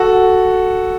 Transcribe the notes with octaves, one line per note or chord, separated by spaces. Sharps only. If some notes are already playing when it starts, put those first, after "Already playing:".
Already playing: F#4 A4